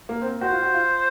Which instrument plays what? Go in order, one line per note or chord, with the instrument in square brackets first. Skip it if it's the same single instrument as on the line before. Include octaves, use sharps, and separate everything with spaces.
[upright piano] A#3
C4
A#3
[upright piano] F#4 [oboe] C5
[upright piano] F4
F#4
F4